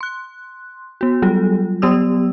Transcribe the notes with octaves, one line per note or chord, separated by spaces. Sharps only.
C6 F#6
B3 F#4
F#3 G3 F4 A4
F#3 B3 G4 D5 D#6 E6